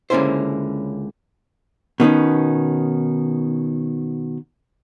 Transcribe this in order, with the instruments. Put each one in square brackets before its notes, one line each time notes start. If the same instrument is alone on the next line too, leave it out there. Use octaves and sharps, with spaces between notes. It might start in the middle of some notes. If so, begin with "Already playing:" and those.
[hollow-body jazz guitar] C#2 D3 A#3 C#4 E4 C5
B2 D#3 B3 C#4